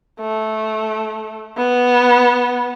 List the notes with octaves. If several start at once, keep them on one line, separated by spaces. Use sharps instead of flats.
A3
B3